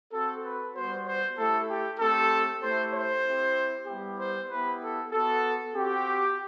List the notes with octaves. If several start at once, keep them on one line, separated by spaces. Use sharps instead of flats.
C4 F#4 A4
B4
G3 B3 F#4 C5
C5
A3 E4 G4 A4
G4
A3 C4 G4 A4
A3 E4 G4 C5
C5
C4 E4 G4
G3 B3 E4 G4
C5
B3 E4 G4 B4
A4
B3 F#4 A4
C4 F#4 G4